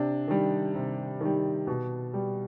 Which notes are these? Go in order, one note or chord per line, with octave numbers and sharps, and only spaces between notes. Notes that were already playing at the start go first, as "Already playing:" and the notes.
Already playing: C3 D4
D#3 G3
C3
D#3 G3
B2
G3